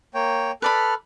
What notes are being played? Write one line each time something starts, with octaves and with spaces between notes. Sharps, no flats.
A#3 C#5 G5
A4 B4 D5 B5 F6